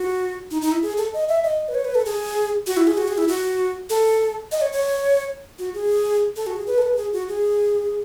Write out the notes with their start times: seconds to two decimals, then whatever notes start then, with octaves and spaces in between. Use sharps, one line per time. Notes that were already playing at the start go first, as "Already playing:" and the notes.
Already playing: F#4
0.51 D#4
0.62 D#4
0.72 E4
0.83 G#4
0.97 A4
1.14 D#5
1.29 E5
1.44 D#5
1.68 B4
1.75 C#5
1.85 B4
1.95 A4
2.06 G#4
2.67 F#4
2.77 E4
2.87 G#4
2.98 F#4
3.08 G#4
3.18 E4
3.28 F#4
3.90 A4
4.52 D#5
4.61 C#5
4.72 C#5
5.59 F#4
5.74 G#4
6.36 A4
6.47 F#4
6.56 G#4
6.67 B4
6.78 A4
6.82 B4
6.93 A4
6.97 G#4
7.13 F#4
7.29 G#4